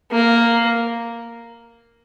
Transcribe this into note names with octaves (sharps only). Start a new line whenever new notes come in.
A#3